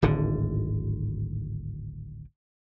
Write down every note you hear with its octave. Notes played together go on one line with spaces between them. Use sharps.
D1 G#1 G#2 D3